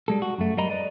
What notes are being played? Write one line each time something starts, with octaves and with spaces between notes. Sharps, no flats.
G3 G#3 A4
F#4
F#2 A3
F#3 G3 A#4 D#5 A#5 B5
B4 D5 D#5